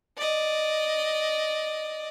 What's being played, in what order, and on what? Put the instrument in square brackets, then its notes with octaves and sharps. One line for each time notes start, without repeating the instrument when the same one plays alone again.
[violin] D5 D#5